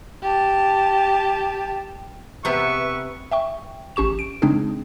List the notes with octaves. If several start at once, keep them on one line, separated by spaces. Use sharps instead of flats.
G4 A5
C3 B3 B4 E5 C#6
E5 G5 C#6
A1 C#4 G4 C#6 E7
D7
C#3 G#3 C4 D4 D#4 G#4